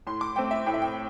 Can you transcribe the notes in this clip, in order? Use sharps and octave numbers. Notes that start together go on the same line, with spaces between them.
A2 C6
D6
A3 C4 G5
E5
A2 G5
E5
G5